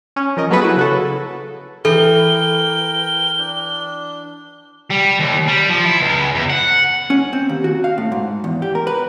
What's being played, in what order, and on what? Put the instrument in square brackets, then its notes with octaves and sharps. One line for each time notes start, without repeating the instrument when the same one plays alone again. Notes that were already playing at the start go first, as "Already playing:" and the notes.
[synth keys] C#4
F3 A#4 D#5
F#3 A#3 B3 G#4 A4 B4
E4 F#4 B4
C#3 F#4 A4
[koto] E3 [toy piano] A4 [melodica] A#4 G5 [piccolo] G7
[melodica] D4
[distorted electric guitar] G3
D#2
G3
F3
E4
C#2
E2
F#5
[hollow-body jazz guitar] C#4
C4
D#2
F#4
F5
A2
G#2
E2
G4
A#4
B4